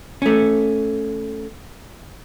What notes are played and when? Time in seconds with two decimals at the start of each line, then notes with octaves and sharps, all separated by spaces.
0.22 A3 C#4